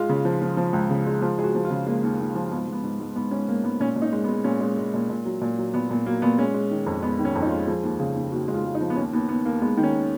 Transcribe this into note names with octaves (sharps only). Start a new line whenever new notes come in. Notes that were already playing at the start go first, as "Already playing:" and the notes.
Already playing: G#2 G#3 F4
C#3
F3
F3
F3
C#2
C#3
G#3
F3 F4
G#3 G#4
F#4
F3
F4
C#3
G#3 A#3
D#2
D#2
F3
G#2 B3
G#2
B3
G#2
G#2
G#2 B3
G#2 C#4
G#2 A#3
G#2 B3
A#2 C#4
A#2
D#4
G#3
B3
G#3
A#2 C#4
G#3
G#3
A#2
A#2
F#3
A#2
F#3
A#2 B3
A#2 B3
F#3 A#3
A#2 B3
G#3 C#4
G#3
D#3
F2
G#3 B3
D#3
C#4
F2
D#4
F4
G#3
F3 G#4
D#2
C#3
D#2
D#2 F#4
G#3
F4
G#3
D#4
F3
B3
D#2 C#4
D#2 B3
D#2 B3
D#2 A#3
G#3 B3
D#3
C#4